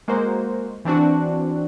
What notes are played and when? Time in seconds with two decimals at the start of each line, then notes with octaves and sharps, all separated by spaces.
0.08 G#3 A#3 F#4 A#4 C5
0.85 E3 C4 D4 F#4